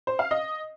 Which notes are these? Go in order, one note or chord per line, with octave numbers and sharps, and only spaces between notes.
C5
F5
D#5